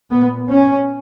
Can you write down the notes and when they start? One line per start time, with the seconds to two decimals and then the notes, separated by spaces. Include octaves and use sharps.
0.11 A#2 B3
0.49 C#4